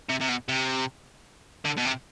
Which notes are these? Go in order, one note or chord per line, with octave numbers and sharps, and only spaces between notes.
C3
C3
B2
C3
D3
B2
C3